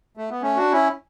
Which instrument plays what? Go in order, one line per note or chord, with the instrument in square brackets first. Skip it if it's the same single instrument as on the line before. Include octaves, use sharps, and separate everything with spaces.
[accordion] A3
B3
A3 C#4
D4 F#4
C#4 E4